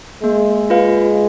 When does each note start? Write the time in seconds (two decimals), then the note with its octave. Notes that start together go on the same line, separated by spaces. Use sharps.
0.23 G#3 A#3
0.70 F4 B4 F5